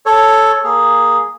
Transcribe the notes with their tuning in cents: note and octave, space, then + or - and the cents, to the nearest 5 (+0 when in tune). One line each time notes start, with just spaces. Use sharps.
A4 +0 C#5 +0
A#3 +0 G#4 +0